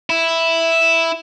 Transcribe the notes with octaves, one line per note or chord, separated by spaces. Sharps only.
E4